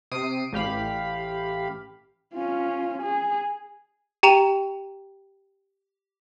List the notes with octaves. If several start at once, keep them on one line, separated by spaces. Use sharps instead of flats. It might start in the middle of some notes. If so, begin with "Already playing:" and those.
C3 D#6 C7 D7 D#7
A1 G4 F5 B5
C#4 F4
G#4
G4 G5 A#5 D#7 F7